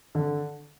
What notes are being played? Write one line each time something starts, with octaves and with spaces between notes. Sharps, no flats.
D3